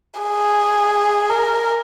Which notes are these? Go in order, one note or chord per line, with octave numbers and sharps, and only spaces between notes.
G#4
A#4